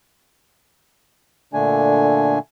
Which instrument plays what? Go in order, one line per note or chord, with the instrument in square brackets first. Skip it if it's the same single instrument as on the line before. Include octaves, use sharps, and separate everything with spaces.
[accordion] A#2 D3 A3 D4 G#5